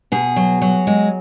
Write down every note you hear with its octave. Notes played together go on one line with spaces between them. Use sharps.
B2 G#4
F#3
F#3
G#3